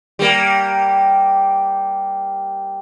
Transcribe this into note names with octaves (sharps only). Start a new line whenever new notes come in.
G3 A#3